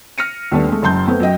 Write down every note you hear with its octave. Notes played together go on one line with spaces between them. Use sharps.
F6 A#6 C#7 D#7
D#2 G3 A3 B3 D4
G#3 A3
F#1 F#2 A5 C6 G6
A3 B3 C4
F#2 F#3 D#5 G5